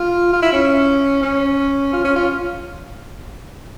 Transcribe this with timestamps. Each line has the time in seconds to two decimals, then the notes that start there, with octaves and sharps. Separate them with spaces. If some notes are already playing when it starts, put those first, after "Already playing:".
Already playing: F4
0.33 F4
0.42 E4
0.53 C#4
1.23 C#4
1.93 F4
2.04 C#4
2.16 F4